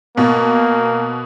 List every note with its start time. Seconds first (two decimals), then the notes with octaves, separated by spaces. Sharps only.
0.17 B2 A#3